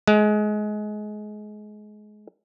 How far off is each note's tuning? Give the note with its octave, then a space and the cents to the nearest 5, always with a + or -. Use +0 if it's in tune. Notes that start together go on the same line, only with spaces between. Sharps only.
G#3 +25